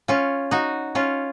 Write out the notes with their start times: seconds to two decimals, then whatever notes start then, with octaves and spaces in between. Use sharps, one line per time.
0.08 C#4 F4
0.51 D#4 F#4
0.95 C#4 F4